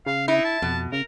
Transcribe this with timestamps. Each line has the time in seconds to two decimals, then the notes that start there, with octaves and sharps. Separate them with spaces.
0.06 C#3 F5
0.28 D#4 E4
0.45 A5
0.62 F2 B2
0.92 C#3 A#4